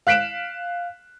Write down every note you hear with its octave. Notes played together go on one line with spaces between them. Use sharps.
F5 F#6 B6 D7 E7